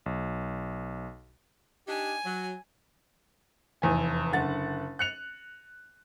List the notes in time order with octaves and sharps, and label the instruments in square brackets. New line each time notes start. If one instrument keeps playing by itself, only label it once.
[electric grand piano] B1
[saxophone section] D4 D#4 G4 [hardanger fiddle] G#5
[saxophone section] F#3
[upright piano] F1 E2 G#5
F#1 D3 F#5 A6
F#6 C#7 F7